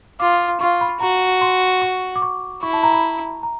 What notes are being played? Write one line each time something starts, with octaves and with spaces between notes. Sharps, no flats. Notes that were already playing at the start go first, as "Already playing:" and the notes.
F4 D6
F4 C#6
B5
F#4 A#5
C6
C#6
D6
C#6
E4 C#6
A5
A#5
B5
A#5